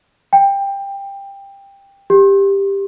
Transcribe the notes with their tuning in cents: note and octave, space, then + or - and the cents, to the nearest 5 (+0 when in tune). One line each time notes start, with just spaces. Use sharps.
G5 +15
G4 +10